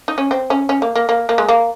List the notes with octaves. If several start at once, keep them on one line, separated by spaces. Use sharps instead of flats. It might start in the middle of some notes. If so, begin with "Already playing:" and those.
D#4
C#4
C4
C#4
C#4
A#3
A#3
A#3
A#3
G#3
A#3